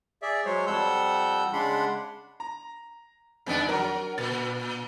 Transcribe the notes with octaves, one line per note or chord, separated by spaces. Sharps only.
G#4 D5 E5
F#3 G#3 C5 C#5
F2 F3 G3 F#5 E6 G6
C#3 G#3 D4 F#5 B5 C6
A#5
F2 D#3 G#3 B3 D4
F#3 A#4 A#5
A#2 A6